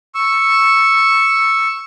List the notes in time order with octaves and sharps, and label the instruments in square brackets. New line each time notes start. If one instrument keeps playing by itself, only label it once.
[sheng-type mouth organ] C#6 E6